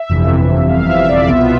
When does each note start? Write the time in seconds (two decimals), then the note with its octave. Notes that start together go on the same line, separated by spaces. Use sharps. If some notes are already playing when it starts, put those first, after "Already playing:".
Already playing: E5
0.09 G1 F2 C3 E3
0.69 F5
0.89 E5
1.08 D5
1.29 C2 B2 B3 F4 E5